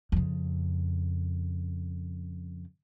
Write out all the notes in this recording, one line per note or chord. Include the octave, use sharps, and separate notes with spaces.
F2 C#3